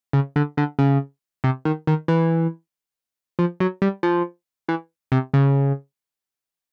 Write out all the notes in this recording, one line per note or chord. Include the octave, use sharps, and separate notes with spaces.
C#3
D3
D3
C#3
C3
D#3
D#3
E3
F3
F#3
G3
F3
E3
C3
C#3